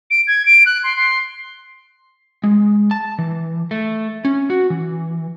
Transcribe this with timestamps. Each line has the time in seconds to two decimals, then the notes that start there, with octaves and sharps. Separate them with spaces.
0.11 D7
0.27 G#6
0.45 D7
0.66 F#6
0.83 C6
0.96 C6
2.44 G#3
2.91 A5
3.19 E3
3.71 A3
4.25 C#4
4.50 F#4
4.70 E3